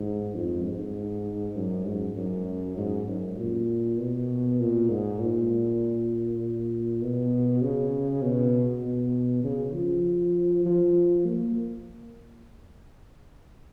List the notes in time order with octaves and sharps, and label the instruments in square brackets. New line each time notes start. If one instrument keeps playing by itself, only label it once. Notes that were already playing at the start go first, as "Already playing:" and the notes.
Already playing: [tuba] G#2
F2
G#2
F#2
G#2
F#2
G#2
F#2
A#2
B2
A#2
G#2
A#2
B2
C#3
B2
B2
C#3
F3
F3
A#3